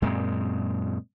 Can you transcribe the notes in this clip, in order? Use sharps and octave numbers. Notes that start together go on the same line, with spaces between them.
F#2 A#2 G#3 C4